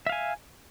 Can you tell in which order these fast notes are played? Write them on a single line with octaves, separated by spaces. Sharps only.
E5 F5 G#5